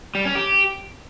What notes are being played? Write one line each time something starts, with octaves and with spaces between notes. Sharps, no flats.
G3
C#4
G4